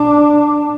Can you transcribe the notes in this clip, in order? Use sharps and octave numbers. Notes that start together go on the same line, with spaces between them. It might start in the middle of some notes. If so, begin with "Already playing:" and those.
Already playing: D4